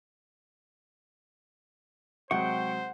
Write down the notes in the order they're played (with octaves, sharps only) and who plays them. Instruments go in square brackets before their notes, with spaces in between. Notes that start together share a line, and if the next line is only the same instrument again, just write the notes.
[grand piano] C3 F#3 G#3 [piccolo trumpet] C5 [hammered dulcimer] F#5 [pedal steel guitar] G5 C#6